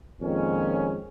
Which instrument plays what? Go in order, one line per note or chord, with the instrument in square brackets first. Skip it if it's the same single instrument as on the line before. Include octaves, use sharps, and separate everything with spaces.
[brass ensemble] F2 A#2 D#3 G#3 C#4